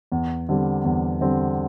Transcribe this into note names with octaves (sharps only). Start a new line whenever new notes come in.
E2
D3 G3 C4
E2
D3 G3 C4